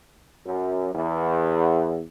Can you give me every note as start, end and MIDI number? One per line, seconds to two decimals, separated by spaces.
0.46 0.90 42
0.94 2.00 40